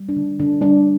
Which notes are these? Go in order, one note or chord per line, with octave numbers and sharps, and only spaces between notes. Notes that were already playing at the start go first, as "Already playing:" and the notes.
Already playing: G3
D4
D3
D3 D4
G3 D4